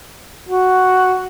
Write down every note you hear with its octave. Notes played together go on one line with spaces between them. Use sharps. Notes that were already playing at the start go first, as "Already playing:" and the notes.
F#4